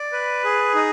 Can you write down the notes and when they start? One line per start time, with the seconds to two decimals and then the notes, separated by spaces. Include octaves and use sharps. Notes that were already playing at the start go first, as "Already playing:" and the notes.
Already playing: D5
0.12 B4
0.44 G#4
0.74 D#4